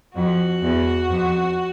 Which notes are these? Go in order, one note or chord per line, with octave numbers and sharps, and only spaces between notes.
F2 F#4
E2
F2